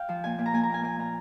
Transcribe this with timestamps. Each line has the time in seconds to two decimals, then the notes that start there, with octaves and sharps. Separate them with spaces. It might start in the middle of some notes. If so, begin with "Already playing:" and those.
Already playing: F5 G5
0.09 F3
0.24 A#2 G#5
0.39 A#2
0.46 A#5
0.53 A#3 G#5
0.63 A#5
0.69 A#2 G#5
0.83 A#3 G#5
0.99 A#2 A#5